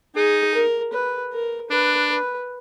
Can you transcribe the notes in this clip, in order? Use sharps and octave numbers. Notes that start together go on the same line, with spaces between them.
D#4 G#4
A#4
B4
A#4
D4 B4
B4